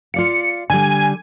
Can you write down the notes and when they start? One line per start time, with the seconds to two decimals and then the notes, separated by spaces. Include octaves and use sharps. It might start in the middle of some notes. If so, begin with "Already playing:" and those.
0.14 F4 D5 F5 C#7
0.70 D3 G3 G#5